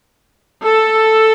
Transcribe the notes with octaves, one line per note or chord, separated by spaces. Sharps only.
A4